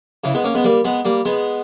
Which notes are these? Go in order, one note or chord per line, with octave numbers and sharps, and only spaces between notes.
C#3 E3
G#3 B3
A#3 C#4
G#3 B3
G3 A#3
G#3 B3
G3 A#3
G#3 B3